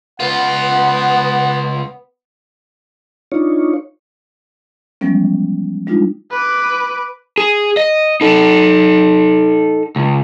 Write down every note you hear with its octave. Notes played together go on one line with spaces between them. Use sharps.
C#2 B3 F4 F#5
D4 D#4 F4 C#5
E3 F3 G3 G#3 B3 C#4
G3 G#3 D4 D#4 F4
B4 D6
G#4
D#5
D#4 A4
C#2